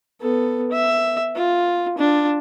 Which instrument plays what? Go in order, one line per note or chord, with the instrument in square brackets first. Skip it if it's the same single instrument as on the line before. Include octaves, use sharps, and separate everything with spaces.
[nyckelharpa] B3 A4
E5
F4
D4 F4